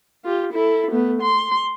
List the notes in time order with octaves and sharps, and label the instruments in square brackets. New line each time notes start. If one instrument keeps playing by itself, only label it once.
[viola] F4 G4
E4 A4
A3 B3
C6